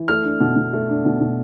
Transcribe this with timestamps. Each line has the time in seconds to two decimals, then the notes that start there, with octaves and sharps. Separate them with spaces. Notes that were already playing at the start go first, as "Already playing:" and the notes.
Already playing: E3
0.08 A3 F6
0.24 D4
0.40 B2
0.56 B2
0.73 A3
0.89 D4
1.05 B2
1.21 B2